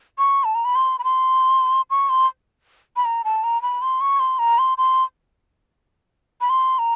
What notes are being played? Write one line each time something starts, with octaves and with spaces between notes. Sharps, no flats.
C#6
A5
A#5
B5
C6
B5
C6
C#6
C6
B5
A#5
A5
A#5
B5
C6
C#6
C6
A#5
C6
C6
B5
C6
A#5